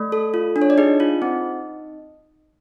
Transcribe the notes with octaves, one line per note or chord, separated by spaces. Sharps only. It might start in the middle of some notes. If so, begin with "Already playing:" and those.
Already playing: A3 D5
A4
F4
D4
C#5
D5
D#4 G#4 D#5
F4
C4